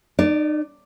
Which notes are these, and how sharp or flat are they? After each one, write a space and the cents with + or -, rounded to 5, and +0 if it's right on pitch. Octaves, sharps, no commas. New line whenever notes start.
D#4 -35 D5 +0